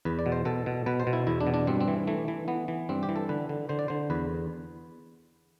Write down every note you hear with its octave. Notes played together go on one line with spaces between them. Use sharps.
E2 B4
D5
B2
C5
B2 A4
B2
B2 B4
C5
B2
E4
E2 E4
D4
B2
D4
G2 C4
C4
E3
E3 A3
E3
E3 B3
E3
G2 C4
G4
E3
A4
D3 B4
D3
D3 C5
D5
D3 C5
E2 B4